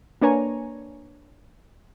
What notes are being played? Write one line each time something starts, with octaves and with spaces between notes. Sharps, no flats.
A#3 D4 B4 C#5 G#5 A#5